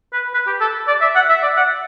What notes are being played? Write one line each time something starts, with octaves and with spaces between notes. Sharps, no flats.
B4
B4
G4
A4
D5
E5
F#5
E5
D5
F#5